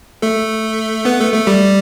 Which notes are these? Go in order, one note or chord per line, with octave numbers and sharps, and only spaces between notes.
A3 A4
B3 B4
A3 A4
A3 A4
G3 G4